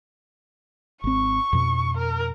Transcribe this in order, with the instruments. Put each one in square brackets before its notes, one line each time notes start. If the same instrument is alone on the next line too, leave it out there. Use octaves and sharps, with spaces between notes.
[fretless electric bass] G#1 C4 [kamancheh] C#6
[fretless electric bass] F2 B2
[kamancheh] A#4